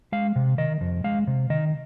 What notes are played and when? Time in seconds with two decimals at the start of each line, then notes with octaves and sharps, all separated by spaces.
0.12 G#3 F5
0.36 C3
0.58 D#3 D#5
0.81 F2
1.04 G#3 F5
1.27 C3
1.50 D#3 D#5